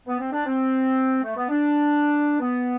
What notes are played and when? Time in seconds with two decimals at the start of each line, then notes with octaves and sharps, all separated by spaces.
0.07 B3
0.20 C4
0.32 D4
0.46 C4
1.24 A3
1.36 B3
1.49 D4
2.40 B3